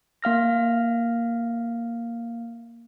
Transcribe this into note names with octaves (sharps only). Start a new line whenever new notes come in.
A#3 F5 F6 A#6